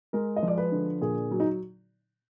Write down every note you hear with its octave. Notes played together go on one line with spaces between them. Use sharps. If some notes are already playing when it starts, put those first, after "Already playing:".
G#3 A#4
D#5
F3
D5
B4
D3
A#2 G#4
F#3
D#4